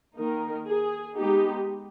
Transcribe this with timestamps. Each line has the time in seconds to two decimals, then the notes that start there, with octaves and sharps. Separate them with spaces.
0.17 D#3 A#3 D#4 A#4
0.66 G#4
1.14 G#3 B3 D#4 G4